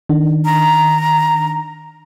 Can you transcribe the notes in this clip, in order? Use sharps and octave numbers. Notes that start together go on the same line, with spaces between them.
D#3 D4
A#5